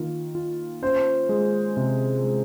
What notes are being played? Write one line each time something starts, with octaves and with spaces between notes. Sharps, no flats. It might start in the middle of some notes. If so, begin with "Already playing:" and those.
Already playing: D#3 A#3 F4
F4
C#4 C5
G#3
C3
G#3